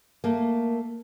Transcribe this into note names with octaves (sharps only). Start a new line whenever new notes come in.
A3 A#3